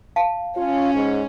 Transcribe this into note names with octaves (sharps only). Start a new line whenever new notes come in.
F5 A5
C#4 F4
G#2